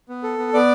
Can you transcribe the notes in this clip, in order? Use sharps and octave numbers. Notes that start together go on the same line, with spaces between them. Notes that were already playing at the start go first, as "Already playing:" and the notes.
B3
A4
B3
B3 D5